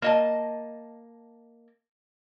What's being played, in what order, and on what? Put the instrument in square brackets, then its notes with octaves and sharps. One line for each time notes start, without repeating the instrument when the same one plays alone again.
[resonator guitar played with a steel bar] A#3 D#5 A5